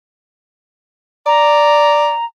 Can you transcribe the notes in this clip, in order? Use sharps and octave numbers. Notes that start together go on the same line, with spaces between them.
D5 A#5